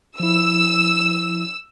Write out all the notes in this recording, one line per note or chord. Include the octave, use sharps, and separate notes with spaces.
F3 E4 E6